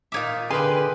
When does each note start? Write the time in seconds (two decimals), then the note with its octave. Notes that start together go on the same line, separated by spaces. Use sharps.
0.12 A#2 D#4 F4 C#5 E5 D6
0.50 D3 G4 G#4 B4 F5 G#5 C6